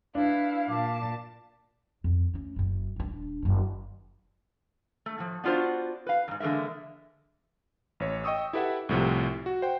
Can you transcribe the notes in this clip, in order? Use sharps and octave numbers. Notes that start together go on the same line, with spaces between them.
D4 E4 B4 F5
A#2 A5 D6
F2
A3 C#4
F#1 F#2
D#1 D4
F#1 D3
A3
A2 F3
B3 D4 F4 F#4 C5
B4 F5
E2 G#2
D3 E3 G#3 A#3 E5
A1 C#5
D#5 G5 C#6 D#6 E6
E4 G4 A4 B4 E5 F#5
C2 A2 C3 F3
F#4
C5 F#5 G5